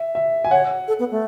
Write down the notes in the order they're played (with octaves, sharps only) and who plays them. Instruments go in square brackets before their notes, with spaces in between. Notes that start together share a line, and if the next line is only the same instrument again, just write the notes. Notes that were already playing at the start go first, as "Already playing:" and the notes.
Already playing: [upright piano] E5
E5
G#5
[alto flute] C#5 [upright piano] F#5
[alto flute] A4
B3
A3